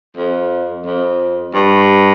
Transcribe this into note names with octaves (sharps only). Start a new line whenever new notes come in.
F2
F2
G2